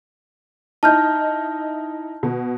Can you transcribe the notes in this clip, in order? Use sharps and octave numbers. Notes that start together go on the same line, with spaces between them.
D#4 E4 D#5 A5 F6 G6
B2